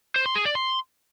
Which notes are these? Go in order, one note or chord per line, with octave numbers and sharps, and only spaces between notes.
C5
C6
G#4
D5
C6